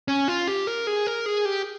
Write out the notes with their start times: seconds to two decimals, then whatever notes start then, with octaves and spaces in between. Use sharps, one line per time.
0.08 C#4
0.28 F4
0.47 G4
0.67 A#4
0.87 G#4
1.06 A#4
1.26 G#4
1.45 G4